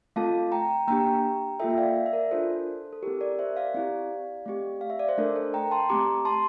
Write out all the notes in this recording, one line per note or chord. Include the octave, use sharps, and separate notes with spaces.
A3 C4 F4 A4 F5 A5
G5 A#5
A#3 D4 G4 G5 A#5
A#3 F4 A4 E5 G5
E5
D5 F5
E5
A#4 D5
D4 F4 A4 C5
A4
C4 E4 G4 A#4
A#4 D5
C5 E5
D5 F5
C4 E4 G4
A3 C4 G4
F5
E5
D5
C5
A3 D4 A4 A#4
A4 C5
G5 A#5
A5 C6
A3 C4 G4 A#5 D6
A5 C6